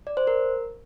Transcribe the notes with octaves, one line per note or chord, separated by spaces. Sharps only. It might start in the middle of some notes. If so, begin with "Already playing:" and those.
D5
C5
A#4